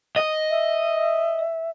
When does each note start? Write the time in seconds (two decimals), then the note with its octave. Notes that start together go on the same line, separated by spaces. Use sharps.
0.16 D#5
0.50 E5